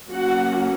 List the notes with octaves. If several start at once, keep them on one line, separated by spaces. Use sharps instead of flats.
F#3 A#3 C#4 F#4 F#5